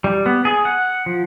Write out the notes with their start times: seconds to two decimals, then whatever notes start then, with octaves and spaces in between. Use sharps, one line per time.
0.04 G3
0.26 B3
0.45 G#4
0.65 F#5
1.06 F3